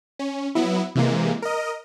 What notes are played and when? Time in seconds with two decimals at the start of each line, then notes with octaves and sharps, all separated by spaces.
0.19 C#4
0.55 F#3 B3 E4
0.95 C3 E3 G#3 A#3
1.42 A#4 D#5